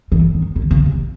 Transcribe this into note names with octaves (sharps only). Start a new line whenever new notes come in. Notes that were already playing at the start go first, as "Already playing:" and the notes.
E3
D#3
D3
C#3
C3